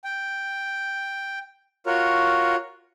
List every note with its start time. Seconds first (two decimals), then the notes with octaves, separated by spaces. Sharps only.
0.04 G5
1.86 F4 F#4 A#4 C#5